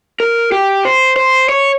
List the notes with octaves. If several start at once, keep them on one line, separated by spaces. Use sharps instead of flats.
A#4
G4
C5
C5
C#5